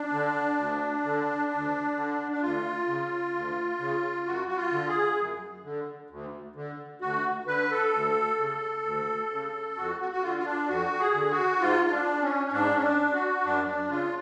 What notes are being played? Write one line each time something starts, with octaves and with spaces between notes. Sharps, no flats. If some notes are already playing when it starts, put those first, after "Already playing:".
Already playing: D4
D3
D2
D3
D2
D3
D4
D2 F4
C#3
D2
C#3
F#2 F#4
F#4
F4
D3
G#4
F#2
D3
D2
D3
D2 F#4
D3 B4
A4
D2
C#3
D2
C#3
F2 F#4
F#4
F#4
D3 F4
F4
D4
F2 F#4
G#4
D3
F#4
G#2 F4
F4
D4
C#4
C#4
G#2 D4
C#4
D4
F#4
F#2 D4
D4
C#3 F4